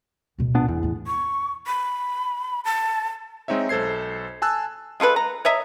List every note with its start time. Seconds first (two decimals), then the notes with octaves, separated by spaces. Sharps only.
0.38 D1 B2
0.55 A#2 B3 D4
0.68 E2 E3
0.83 A2 A3
1.07 C#6
1.67 B5
2.65 A5
3.48 G#3 C4 D#4 C#5 E5
3.69 B1 A4 C5 G#6 C7
4.42 G#5 A5 E6 F#6
5.00 G#3 F4 A4 B4
5.16 A#5
5.45 C#5 D#5 E5 A#5